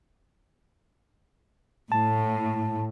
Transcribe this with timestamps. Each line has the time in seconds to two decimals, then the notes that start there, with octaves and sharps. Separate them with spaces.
1.92 A2 A5